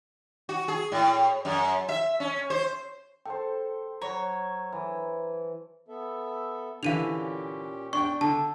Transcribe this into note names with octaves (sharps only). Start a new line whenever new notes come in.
F#4
G#4
A2
F#2
E5
C#4
C5
A4 C5 G5
F#3 C#5 A#5
E3
B3 A4 E5
A#2 D3 E3 C#4 G4 F5 D#7 F7
D4 G5 C#6
D3 A5